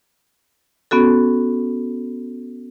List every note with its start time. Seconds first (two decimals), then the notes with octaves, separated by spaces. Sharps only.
0.91 B3 C#4 F#4 A4